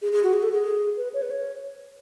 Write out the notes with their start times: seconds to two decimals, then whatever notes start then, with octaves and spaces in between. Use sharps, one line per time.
0.02 G#4
0.12 G#4
0.23 F#4
0.34 G#4
0.43 A4
0.52 G#4
0.97 B4
1.14 C#5
1.22 B4
1.30 C#5